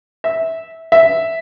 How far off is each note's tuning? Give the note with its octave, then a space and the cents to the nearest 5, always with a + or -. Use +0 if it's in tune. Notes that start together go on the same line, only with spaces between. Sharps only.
E5 -15
E5 -5